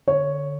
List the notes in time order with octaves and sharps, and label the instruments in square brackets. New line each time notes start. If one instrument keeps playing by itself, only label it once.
[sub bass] D3 [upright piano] C#5